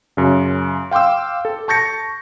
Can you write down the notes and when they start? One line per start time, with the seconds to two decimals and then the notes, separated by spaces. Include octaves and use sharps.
0.17 F#2 C#3
0.91 F5 G5 C6 D6 E6
1.45 A4
1.68 A5 C#6 G6 A6 A#6 C#7